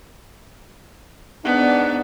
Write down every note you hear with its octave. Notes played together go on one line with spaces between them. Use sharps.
G#2 B3 D4